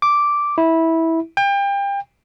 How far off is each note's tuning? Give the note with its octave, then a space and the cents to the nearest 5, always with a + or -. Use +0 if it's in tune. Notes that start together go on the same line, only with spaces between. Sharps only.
D6 -5
E4 -15
G5 +30